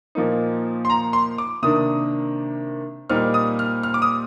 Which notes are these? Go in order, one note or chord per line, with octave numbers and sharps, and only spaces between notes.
A#2 F3 A#3 D#4
C6
A#5
C6
D6
C3 D#3 A#3 D4 D#6
A#2 G3 C4 D#4 F6
D#6
F6
F6
D6
D#6